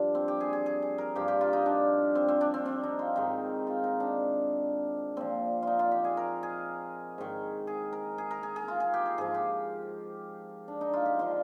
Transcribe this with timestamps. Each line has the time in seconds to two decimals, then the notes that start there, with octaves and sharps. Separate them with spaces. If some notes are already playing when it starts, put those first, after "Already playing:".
Already playing: G2 F3 D4 F4
0.15 C4
0.28 G4
0.40 G#4
0.53 G#4
0.66 G#4
0.82 G#4
0.98 A#4
1.16 G2 F3 G4
1.28 G4
1.41 F4
1.53 D#4
1.66 D4
2.15 C4
2.28 C4
2.41 D4
2.54 C4
2.65 C4
2.83 D#4
2.99 F4
3.16 G#2 D#3 D#4
3.67 F4
3.84 D#4
4.00 D4
5.16 A#2 F3 C4
5.63 D#4 F4
5.79 F4
5.91 G4
6.04 G#4
6.17 A#4
6.43 G#4
7.18 G#2 D#3
7.67 G#4
7.93 A#4
8.18 G#4
8.31 A#4
8.43 G#4
8.56 G#4
8.68 F4
8.80 G#4
8.94 G4
9.06 G#4
9.18 G#2 F3 G#4
9.34 G4
10.68 D4
10.81 D#4
10.93 F4
11.06 G4
11.19 D3 F3 F4